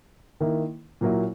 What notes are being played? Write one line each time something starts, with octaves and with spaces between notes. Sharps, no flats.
D#3 A#3 E4
A#2 F#3 A#3 E4